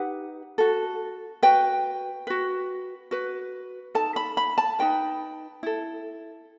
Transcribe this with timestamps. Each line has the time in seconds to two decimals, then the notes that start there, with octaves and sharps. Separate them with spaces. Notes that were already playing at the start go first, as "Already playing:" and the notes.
Already playing: D#4 G4 B4 F#5
0.58 F#4 A4
1.43 F#4 B4 G5
2.27 F#4 B4
3.11 F#4 B4
3.95 D#4 A4 A5
4.16 B5
4.37 B5
4.58 A5
4.79 D#4 F#4 B4 G5
5.63 E4 A4